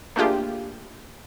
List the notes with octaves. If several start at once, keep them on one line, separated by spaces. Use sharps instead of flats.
A3 A#3 D4 F4 G4 G#4